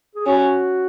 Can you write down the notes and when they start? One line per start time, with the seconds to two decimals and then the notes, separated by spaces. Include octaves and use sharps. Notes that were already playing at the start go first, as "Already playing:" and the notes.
0.15 G#4
0.26 C#4 F#4